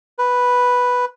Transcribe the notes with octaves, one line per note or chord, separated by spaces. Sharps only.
B4